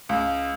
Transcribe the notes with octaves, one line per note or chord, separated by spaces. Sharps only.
C#2